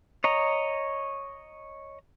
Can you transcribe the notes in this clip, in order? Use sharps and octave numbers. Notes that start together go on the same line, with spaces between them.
C#5 D#5 A#5